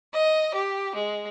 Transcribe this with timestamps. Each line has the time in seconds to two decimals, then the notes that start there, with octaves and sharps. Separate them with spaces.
0.13 D#5
0.53 G4
0.94 G#3